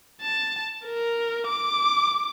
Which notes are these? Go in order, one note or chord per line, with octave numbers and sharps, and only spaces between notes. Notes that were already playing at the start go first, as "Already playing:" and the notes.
A5
A#4
D6